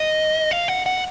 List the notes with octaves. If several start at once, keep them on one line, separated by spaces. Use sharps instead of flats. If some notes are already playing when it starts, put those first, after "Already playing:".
Already playing: D#5
F5
F#5
F#5